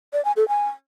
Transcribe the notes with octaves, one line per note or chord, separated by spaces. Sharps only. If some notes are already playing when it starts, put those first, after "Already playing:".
D5
G#5
A4
G#5